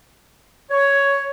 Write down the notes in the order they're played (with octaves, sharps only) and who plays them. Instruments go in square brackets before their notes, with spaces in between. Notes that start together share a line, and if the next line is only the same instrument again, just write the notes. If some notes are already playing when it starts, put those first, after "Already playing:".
[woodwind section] C#5